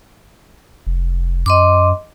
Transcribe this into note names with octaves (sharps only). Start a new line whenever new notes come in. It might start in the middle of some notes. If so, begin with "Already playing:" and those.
F1
F#2 D#5 C6 D6